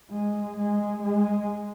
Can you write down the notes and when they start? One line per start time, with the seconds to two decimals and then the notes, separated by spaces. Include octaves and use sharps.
0.10 G#3
0.57 G#3
1.03 G#3